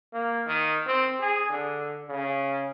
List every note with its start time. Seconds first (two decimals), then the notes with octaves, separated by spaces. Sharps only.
0.13 A#3
0.46 D#3
0.86 C4
1.20 G#4
1.50 D3
2.08 C#3